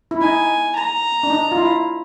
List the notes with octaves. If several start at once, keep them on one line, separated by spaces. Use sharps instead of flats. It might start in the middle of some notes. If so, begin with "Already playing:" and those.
E4
D#4 G#5
A#5
D4
D#4
F4
E4